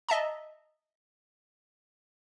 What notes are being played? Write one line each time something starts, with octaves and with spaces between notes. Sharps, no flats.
D#5 E5 A5 A#5